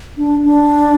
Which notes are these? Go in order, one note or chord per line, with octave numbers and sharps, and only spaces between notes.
D4
D4